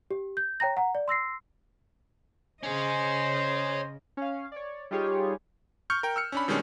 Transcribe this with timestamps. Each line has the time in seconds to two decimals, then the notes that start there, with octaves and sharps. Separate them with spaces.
0.11 G4
0.37 G6
0.60 C#5 G5 A#5 A#6
0.77 F#5 A#5
0.95 D5
1.08 C6 E6 A#6 C7
2.63 C#3 C#4 G#4 C5 D#5
4.17 C#4 F5
4.52 C#5 D5
4.91 G3 D#4 F4 G4 G#4 C#5
5.90 C#6 F6 G6 C#7
6.03 A#4 G5
6.16 E6 F6 C#7
6.32 C#4 D4 B5
6.48 B2 D#3 G3 G#3 C#4 D4